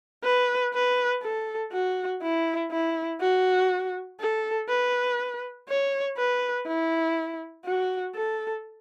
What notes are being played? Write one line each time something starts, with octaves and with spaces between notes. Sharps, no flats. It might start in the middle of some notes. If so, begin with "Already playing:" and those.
B4
B4
A4
F#4
E4
E4
F#4
A4
B4
C#5
B4
E4
F#4
A4